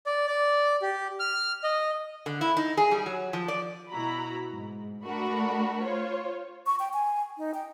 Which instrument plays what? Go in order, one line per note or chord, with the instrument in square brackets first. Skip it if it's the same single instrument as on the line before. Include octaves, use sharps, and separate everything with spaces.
[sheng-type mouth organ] D5
D5
G4
F6
D#5
[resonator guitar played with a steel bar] D3
E4
D#4
G#4
G3
F#3
F3
D5
[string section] B2 E4 F#4 A#5 B5
G#2
A3 D4 F#4 A#4 B5 C#6
F4 C5 C#5
[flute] C#6
G5
G#5
D#4
G5